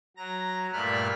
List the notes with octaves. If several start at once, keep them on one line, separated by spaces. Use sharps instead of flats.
F#3 A#5 A#6
G2 A#2 A3 B5 F6 F#6